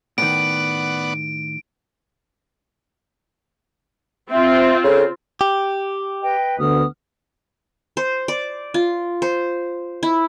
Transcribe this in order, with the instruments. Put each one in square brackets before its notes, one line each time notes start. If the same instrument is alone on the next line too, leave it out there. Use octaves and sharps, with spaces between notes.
[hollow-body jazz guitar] A2 D#3 [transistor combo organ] B3 D5 F#5 [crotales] D7
[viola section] C4 F4 [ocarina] E5
[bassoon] C#3 [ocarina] A4
[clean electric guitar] G4
[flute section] B4 D#5 G5
[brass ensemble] D2 B3 [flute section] D#6 F6
[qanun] C5
D5
F4
C5
E4